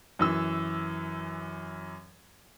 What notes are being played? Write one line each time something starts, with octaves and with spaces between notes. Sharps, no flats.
F#2 E3 E6